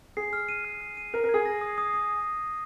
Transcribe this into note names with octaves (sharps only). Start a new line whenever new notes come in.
G#4 C7
F6
D#7
F6
F6
D#7
A#4 D#7
A#4
G#6
G#4
A#6
D#6
D#6
D#6